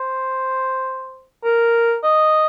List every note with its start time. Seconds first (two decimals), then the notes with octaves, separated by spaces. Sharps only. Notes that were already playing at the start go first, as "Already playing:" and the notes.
Already playing: C5
1.44 A#4
2.03 D#5